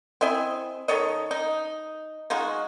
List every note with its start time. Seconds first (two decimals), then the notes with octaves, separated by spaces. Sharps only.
0.21 C4 E4 D#5 G#5
0.88 D#3 A4 C#5 D#5
1.31 D#4
2.30 G#3 D#4 F4 F#4